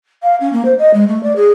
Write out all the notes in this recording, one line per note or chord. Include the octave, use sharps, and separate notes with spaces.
F5
C#4
A#3
C5
D#5
G#3
A3
D5
G#4